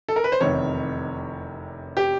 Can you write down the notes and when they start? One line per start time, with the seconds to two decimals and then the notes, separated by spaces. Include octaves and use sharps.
0.09 A4
0.16 A#4
0.24 B4
0.32 C5
0.41 F1 E2 C3 D#3 C#5
1.97 G4